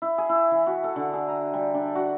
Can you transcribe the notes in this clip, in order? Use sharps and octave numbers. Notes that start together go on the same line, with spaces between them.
E4
G#4
E4
E3
F#4
A4
D3
G#4
A#5
G3
D4
F#4